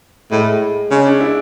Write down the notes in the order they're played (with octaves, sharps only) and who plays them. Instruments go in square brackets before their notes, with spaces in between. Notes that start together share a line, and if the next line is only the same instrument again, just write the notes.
[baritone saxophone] A2 [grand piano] G#3
[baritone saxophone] C#3 [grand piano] G#3
[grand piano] D4
E4